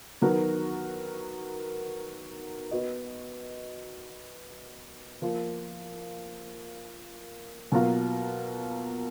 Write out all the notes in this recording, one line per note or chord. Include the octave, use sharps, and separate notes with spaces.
D#3 F#3 B3 F#4 A#4
B3 F#4 B4 D#5
F3 A#3 F4
B2 F#3 A#3 F4 A#4